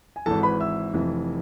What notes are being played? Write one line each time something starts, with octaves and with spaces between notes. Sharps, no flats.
G#5
G#1 G#2 E3 A4 A5
B4 B5
E5 E6
F1 F2 E3